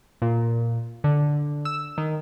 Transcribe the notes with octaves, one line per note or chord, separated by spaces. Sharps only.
A#2
D3
E6
D#3